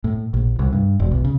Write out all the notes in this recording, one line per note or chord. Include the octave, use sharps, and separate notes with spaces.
A2
A#1
C2
G2
E1
B1
C#3